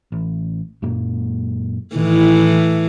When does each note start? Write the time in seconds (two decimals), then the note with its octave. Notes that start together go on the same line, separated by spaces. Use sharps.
0.12 A1
0.82 F#2 A#2 A#3
1.96 A2 D#3 E3